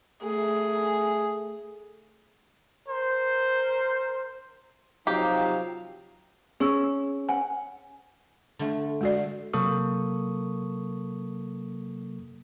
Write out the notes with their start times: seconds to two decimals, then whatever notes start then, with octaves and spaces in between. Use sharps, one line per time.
0.24 A3 G#4
2.88 A#4 C5
5.07 C3 F3 F#3 D#4 G4 F5
6.60 C#4 G#4 C#6 E6
7.29 F#5 G#5
8.59 D3 A3
9.01 G#3 F#4 D5
9.54 C3 F#3 A#3 A4 C#6 D#6